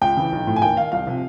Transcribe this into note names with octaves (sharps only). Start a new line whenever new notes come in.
C#2 G5
C#3 E3
B1
A2 F3
G#5
D#2 G5
D#3 F5
C2 F5
C3 F3